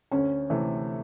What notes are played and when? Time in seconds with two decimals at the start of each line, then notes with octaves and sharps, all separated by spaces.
0.11 D2 C#4
0.50 C3 E3 A3